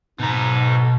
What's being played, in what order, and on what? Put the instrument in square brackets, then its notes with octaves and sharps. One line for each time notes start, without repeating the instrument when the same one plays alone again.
[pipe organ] G#2 D#4 [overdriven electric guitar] B2 A#5